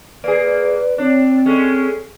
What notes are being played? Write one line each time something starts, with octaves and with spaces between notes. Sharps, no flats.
A#3 G#4 B4 D5
C4 D4 C#5
G#3 C#4 A4